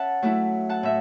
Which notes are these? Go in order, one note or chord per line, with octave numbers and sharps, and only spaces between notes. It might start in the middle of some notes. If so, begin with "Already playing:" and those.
Already playing: C#4 E5 F#5 A5
F#3 A3 E4
F#5 A5
A2 E5